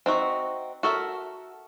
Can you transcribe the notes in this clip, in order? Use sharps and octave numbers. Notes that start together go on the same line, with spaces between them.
C4 D#4 F#4 E5
F#4 A4 A#4 E5